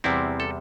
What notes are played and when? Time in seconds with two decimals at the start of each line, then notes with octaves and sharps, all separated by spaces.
0.04 E2 C3 G3 C4 E4
0.40 A4